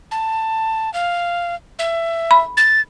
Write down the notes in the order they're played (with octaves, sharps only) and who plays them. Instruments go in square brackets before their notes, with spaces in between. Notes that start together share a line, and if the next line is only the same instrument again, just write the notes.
[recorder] A5
F5
E5
[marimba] B5
[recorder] A6